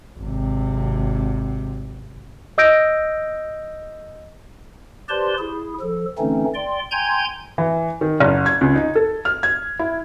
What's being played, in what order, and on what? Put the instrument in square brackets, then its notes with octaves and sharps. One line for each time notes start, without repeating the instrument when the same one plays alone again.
[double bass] G#1 C3
[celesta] D#5 D#6 E6 G6 A#6 D7
[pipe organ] G4 B4 C5 D5 A5 C6
E4 G#4
F3 A4
D3 E3 A3 C4 C#4 D#4
D5 G5 C6
G5 G#5 A#5 C6 G6 G#6
[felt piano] E3
D#3
F#1
G#6
C#2
D#4
A4
F6
G#6
E4